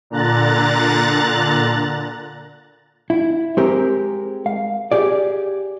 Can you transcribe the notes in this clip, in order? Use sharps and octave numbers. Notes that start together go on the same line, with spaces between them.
A#2 D3 A#5 F#6 A6
E4
G#3 C4 G4 A#4
F5
G4 G#4 D5